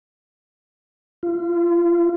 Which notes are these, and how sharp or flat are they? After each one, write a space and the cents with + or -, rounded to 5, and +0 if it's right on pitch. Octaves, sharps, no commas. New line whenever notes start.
F4 -30